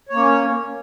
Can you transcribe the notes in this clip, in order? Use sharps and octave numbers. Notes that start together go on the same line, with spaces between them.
A#3 C#4 C#5